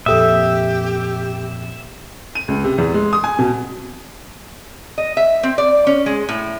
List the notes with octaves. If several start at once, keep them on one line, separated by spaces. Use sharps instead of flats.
F2 A#2 G4 A4 E5 D#6
D#7
C#2
C3
E2
G#3
D#6
G#5
B2
D#5
E5
C4
D5
C#4
G#3
A2